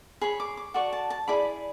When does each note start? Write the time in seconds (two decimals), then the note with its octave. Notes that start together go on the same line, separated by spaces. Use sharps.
0.21 G#4 C#5 B5
0.40 D6
0.57 D6
0.74 F#4 A4 D5 C#6
0.92 A5
1.10 A5
1.28 E4 G#4 D5 B5